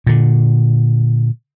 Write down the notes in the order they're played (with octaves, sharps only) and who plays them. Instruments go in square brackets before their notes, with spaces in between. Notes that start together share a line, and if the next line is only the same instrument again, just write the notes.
[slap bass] A#2 D3